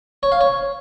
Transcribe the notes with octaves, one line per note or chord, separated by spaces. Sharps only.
C#5
F5
C#5